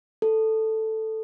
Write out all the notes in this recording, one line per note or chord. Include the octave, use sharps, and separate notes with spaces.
A4